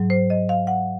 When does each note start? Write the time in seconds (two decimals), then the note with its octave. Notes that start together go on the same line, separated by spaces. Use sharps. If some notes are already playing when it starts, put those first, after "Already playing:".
Already playing: G#2 F#3
0.10 C5
0.30 D#5
0.49 F5
0.67 F#5